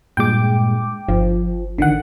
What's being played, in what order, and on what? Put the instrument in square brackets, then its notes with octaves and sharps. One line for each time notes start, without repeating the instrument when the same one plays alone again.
[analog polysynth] G2 A#2 G#3 [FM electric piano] G5 D6
[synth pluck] G1 [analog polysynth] F3
[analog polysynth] A1 [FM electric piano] D3 D#3 F#5